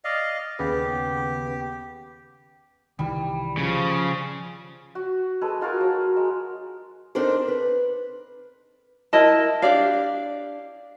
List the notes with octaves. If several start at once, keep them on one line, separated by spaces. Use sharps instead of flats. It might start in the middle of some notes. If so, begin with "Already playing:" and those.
D5 D#5 F5
D#2 C#3 B3 G4
C2 D#3 E3 G3
C#3 F3
F#4
G#3 G#4 A4 B4
D#4 F4 F#4 A#4
F#3
G#3
C4 D4 D#4 A4 A#4 C5
B4
E4 A#4 D#5 A5
D4 G4 D5 F5